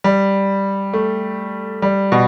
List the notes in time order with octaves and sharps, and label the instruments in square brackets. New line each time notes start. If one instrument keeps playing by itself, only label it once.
[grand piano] G3
A3
G3
B2